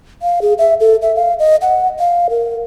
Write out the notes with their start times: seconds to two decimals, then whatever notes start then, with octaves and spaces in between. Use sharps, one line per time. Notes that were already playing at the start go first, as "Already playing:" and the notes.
0.22 F5
0.42 G#4
0.58 E5
0.80 A4
1.02 E5
1.16 F5
1.39 D#5
1.62 F#5
1.99 F5
2.30 A#4